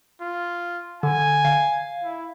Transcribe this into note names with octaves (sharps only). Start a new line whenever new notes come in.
F4
D3 G#5
F5
E4